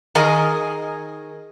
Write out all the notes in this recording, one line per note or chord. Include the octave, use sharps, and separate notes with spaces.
D#3 G#4 A#4 D#5 G#5 A#5